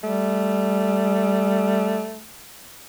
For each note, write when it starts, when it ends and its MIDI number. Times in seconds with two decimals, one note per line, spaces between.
0.04 2.23 55
0.04 2.27 57